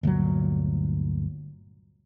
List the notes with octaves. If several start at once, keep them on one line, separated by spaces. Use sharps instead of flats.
G1 D2 A#2 F#3